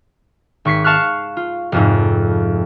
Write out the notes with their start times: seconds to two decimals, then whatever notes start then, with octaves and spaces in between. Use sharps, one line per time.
0.65 G#1 C#6 B6 C7
0.84 F5 A5 C#6 F6 F#6
1.37 F4
1.72 F1 F2 G#2